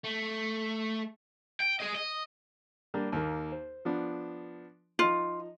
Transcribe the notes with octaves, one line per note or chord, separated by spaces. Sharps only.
A3
G5
G#4 D#5
D#5
G3 A#3 D4
D#2 A#3
C5
F3 B3 D4
F3 D#4 F4